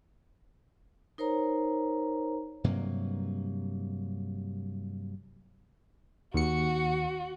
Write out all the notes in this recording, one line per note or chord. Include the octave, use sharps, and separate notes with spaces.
D#4 A#4 C5 C#5 A#5
G2 C3 F#3 A#3
D#2 F#4 C#7